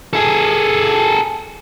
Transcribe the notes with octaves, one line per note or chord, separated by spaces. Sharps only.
G#4 A4